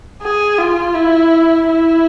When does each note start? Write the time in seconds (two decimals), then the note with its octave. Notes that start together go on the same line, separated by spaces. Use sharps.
0.22 G#4
0.58 F4
0.95 E4
1.68 E4